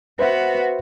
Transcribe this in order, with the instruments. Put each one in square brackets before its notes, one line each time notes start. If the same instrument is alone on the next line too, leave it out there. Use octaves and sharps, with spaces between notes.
[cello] B3 F#4 [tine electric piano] B4 C5 E5